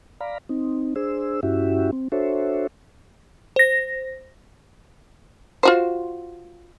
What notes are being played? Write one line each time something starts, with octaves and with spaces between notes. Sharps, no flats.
D5 F5 A#5 B5
C4 D#4
D4 G#4 C5 E6
G2 C#4 E4 F#4 G4 E5
C4
D4 F#4 A4 C5 C#5 E5
C5 A#6
F4 F#4 C5